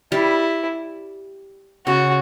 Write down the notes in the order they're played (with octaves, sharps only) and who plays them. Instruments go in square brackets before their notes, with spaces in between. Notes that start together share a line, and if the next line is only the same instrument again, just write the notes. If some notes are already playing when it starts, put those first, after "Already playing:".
[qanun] G3 [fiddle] E4
[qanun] C#3 [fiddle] F#4